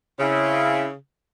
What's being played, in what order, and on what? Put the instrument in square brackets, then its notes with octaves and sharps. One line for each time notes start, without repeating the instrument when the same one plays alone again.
[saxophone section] C#3 [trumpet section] C4 E4